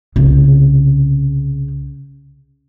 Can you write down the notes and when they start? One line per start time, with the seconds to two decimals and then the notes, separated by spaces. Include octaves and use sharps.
0.16 C2 C#3